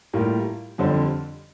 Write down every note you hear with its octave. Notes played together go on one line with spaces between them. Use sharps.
A2 G3 A#3 F4
F2 D3 G3 C4